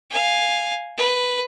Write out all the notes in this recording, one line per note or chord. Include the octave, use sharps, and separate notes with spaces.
F5 G#5
B4